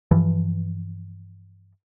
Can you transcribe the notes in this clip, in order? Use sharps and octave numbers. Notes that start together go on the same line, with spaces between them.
G2 E3 F3